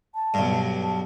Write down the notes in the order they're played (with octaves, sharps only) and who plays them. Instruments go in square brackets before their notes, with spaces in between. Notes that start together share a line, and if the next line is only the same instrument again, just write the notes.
[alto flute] A5
[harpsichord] B1 G2
[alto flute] A5